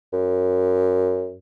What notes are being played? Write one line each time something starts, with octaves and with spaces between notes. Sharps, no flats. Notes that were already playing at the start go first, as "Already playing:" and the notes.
F#2